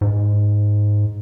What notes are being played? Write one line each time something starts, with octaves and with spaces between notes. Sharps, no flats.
G#2